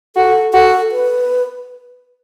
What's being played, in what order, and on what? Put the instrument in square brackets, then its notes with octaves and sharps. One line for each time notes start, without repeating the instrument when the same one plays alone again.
[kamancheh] F#4 [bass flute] A4
[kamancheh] F#4 [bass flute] A4
[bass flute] B4